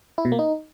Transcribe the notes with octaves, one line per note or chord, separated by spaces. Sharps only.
E4
B2
A#3
D#4